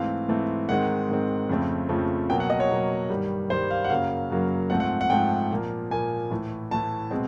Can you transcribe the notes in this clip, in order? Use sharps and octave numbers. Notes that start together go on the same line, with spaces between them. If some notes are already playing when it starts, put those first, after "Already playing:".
Already playing: G#2 E3 A3 C4 F5
G#2 E3 A3 C4
G#2 D#3 G#3 C4 F#5
G#2 D#3 G#3 C4
F2 C#3 F3 A3 C4
F2 C#3 F3 A3 C4
B2 F#3 A#3 G5
F#5
D#5
C#5
B2 F#3 A#3
G2 D#3 G3
G2 D#3 G3 C5
F5
F#5
F#2 C#3 F#3 A#3 F5
F#2 C#3 F#3 A#3
G#2 F3 A3 C4 F#5
F#5
F#5
G#2 F3 A3 C4 G5
A#2 F3 A#3
A#2 F3 A#3 G#5
A2 E3 A3
A2 E3 A3 A5
B2 G#3 C4